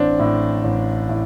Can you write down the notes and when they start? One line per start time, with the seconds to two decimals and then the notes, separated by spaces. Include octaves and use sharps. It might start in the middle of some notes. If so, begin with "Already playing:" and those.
Already playing: A1 C4 D4
0.19 A2
0.64 A1
1.09 A2